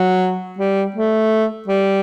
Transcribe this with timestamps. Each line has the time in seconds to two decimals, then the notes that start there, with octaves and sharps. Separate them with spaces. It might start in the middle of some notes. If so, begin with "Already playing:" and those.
Already playing: F#3
0.58 G3
0.96 A3
1.68 G3